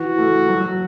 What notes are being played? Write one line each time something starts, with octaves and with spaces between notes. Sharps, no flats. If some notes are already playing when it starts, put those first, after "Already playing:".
Already playing: E3 F#4
A3
F#3